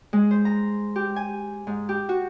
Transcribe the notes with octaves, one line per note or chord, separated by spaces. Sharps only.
G#3
C5
A#5
G4
G#5
G#2
G4
F#4